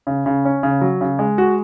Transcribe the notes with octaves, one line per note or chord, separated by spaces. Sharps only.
C#3
C#3
C#4
C#3
F#3
C#3
G#3
F#4